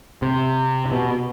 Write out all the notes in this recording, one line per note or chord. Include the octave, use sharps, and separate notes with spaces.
C3
C3
B2